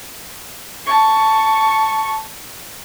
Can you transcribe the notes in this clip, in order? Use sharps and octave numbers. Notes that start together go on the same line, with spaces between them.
A5 C#6